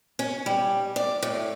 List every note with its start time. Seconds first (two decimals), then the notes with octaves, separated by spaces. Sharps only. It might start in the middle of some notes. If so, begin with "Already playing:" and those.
0.19 C#4
0.46 G3
0.96 D5
1.23 A2